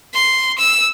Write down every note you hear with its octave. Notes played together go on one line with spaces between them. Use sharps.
C6
E6